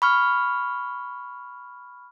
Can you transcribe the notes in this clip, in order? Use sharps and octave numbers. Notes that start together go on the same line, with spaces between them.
B5 C#6 F6